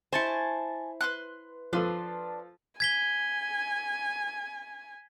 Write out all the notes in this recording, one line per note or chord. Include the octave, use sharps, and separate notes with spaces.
E4 C5 G#5 A5 C#6
B4 C6 F#6
F3 D4 F4 A4 B4 C6
G#5 G#6 B6 G7